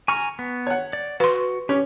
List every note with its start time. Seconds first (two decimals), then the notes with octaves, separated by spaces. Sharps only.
0.08 G#5 A#5 C#6 F6
0.39 B3
0.67 C#5 F#5
0.93 D5
1.20 F#4 B4 C6
1.69 C#4 G4